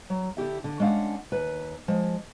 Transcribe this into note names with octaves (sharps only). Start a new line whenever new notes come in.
F#3
D3 E4 G4 E5
D3
G#3 C#4 D4 F5 F#5
D#2 B4
F3 G#3